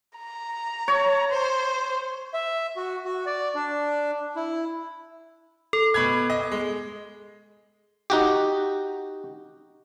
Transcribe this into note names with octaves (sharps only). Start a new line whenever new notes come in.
A#5
C#5
C5
E5
F#4
F#4
D5
D4
E4
A4
B2 B5 G#6
D#5
G#3
D#4 F#4 G4